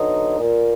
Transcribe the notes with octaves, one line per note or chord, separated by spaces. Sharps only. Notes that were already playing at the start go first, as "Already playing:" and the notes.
Already playing: D3 F#3 B3 D#4
A#2